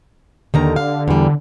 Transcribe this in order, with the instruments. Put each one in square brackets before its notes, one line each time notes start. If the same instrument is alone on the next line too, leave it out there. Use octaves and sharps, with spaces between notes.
[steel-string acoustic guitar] D#2 D#3 A#5 [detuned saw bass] D3
[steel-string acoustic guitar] F5
E2 G3